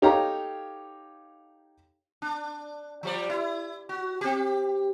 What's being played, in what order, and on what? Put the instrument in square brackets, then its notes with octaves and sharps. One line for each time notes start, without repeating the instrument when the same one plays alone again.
[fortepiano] D#4 G4 A4 C#5 F5 A#5
[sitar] D4
F3 G3 D5
E4
F#4
C4 G4